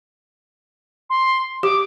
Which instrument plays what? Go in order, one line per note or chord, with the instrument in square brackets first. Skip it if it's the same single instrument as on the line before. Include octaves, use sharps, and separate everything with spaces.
[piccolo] C6
[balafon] G4 [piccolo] D6